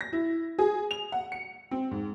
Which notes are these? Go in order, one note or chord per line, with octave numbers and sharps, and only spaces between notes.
A#6
E4
G#4
F7
F#5
C#7
C4
G#2